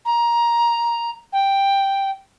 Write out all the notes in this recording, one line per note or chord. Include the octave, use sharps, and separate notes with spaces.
A#5
G5